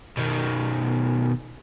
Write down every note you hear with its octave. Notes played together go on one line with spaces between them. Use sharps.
B2 D#3